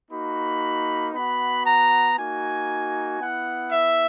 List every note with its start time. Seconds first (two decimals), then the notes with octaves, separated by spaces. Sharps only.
0.11 A#3 D#4 F#4 B5
1.13 B3 F#4 B5
1.65 A#5
2.17 A#3 D#4 F#4 G#5
3.19 B3 E4 F#5
3.71 E5